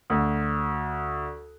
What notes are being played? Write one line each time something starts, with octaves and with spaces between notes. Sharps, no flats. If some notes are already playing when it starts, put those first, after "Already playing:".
D2